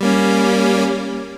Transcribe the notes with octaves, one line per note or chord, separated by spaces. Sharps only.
G3 A#3 C#4